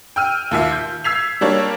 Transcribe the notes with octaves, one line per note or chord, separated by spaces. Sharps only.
G5 E6 F6 D#7
D#2 A#2 E5
G6
E6 G#6 B6 C7 F7
G3 A#3 D4 C#5